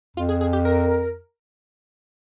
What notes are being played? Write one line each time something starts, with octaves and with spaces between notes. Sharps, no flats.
F2 F4
G#4
G#4
G4
A#4